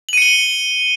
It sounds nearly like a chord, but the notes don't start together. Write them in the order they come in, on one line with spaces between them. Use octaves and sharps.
F#7 D#7 C#7 G7